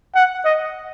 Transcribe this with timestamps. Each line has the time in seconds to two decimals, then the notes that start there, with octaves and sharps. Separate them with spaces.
0.15 F#5
0.45 D#5